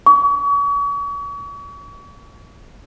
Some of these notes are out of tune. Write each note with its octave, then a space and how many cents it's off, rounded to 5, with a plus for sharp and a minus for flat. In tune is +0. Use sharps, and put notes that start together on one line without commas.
C#6 +40